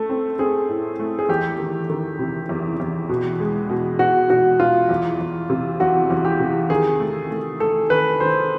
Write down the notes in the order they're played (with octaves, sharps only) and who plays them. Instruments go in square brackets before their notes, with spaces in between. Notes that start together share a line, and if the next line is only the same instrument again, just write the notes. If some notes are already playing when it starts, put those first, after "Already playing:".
Already playing: [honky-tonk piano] A3 [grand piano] A4
[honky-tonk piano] C4
[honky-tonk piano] C4 [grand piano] G#4
[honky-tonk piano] A2
A3
[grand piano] G#4
[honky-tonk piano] E2 [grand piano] G4
[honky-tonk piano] D#3
D#3
C3
E2
E2
B2
G#3
B2
[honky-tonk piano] B2 [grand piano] F#4
[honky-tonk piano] B2 [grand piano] F#4
[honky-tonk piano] B2 [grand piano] F4
[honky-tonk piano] E2
E2
C3
[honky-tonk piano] E2 [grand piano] F#4
[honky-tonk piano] E2
[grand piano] G4
[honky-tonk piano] C3
[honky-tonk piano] D#3 [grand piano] G#4
[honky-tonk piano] A3
A3
[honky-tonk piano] A3 [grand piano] A4
[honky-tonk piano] D#3 [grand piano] B4
[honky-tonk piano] D#3 [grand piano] C5